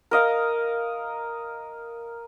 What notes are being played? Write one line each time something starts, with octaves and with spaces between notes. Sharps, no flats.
A#4 D#5 F5